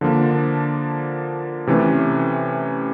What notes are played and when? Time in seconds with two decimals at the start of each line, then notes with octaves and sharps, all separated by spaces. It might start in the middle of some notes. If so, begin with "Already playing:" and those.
0.01 D3 F3 A#3 D4
1.67 C3 E3 A3 C#4